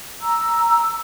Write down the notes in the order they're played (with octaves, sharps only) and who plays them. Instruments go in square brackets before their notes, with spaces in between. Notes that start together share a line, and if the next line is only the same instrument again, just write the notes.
[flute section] A#5 E6